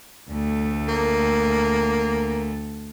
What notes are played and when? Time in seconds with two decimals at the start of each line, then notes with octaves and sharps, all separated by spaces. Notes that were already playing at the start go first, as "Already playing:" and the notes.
0.30 D2 A3
0.88 A#3